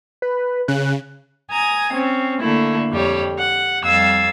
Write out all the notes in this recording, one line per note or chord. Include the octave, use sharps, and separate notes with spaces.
B4
C#3 F#6
G#5 A#5 D#6 G#6
C4 C#4
D3 A3 A#3 E4
F2 G3 G4 C#5
F#5
F2 G3 F5 E6 G#6 A6